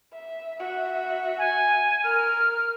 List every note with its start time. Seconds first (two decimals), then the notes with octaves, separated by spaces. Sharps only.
0.12 E5
0.59 F#4 E5
1.38 G#5
2.04 A#4 F6